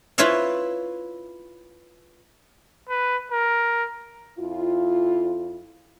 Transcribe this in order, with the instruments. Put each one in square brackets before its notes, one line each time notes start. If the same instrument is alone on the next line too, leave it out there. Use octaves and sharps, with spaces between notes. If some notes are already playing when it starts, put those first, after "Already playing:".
[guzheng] E4 F4 B4 C#5 E5 F5
[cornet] B4
A#4
[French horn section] F2 E4 F4